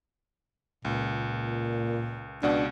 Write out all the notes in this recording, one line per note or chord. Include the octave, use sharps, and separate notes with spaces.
C#2 A#2
C#2 B2 D4 F#5